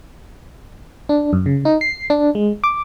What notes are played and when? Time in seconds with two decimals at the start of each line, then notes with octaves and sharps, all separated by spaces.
1.09 D4
1.33 F#2
1.46 C#3
1.65 D#4
1.81 C7
2.10 D4
2.35 G#3
2.64 D6